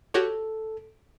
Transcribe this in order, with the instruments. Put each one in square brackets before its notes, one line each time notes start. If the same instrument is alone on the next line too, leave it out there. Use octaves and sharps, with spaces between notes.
[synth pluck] F#4 G4 C#5 [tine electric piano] A4